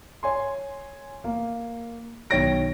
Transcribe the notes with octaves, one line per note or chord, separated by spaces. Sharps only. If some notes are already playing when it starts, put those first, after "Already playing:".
C#5 G#5 C6
A#3
B1 D#3 C#5 G5 A#6 D7